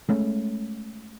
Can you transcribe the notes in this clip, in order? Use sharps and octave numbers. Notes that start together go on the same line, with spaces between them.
G#3 A3 C#4